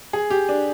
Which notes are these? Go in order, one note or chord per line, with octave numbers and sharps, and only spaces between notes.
G#4
G4
D4